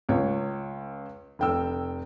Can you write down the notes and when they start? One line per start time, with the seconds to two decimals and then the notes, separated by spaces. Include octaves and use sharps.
0.09 C#2 C#5
1.39 F1 G5 E6